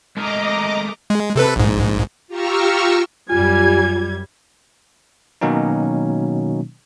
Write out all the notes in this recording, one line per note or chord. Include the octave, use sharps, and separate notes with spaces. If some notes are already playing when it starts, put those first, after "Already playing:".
G#3 A3 A#4 D#5 A#5 D6
G#3
C3 A4 B4
A#1 G#2
F4 G4 A#5 C#6 E6 F6
F#2 G3 F4 G#5 G#6
B2 D#3 F#3 A#3 C#4 D#4